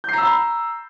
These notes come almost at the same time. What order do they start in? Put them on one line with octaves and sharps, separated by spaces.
G6 C7 A#5 E6 B5